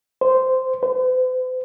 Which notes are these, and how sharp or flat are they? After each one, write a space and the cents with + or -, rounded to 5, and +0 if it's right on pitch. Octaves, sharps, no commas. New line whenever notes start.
C5 -10
C5 -45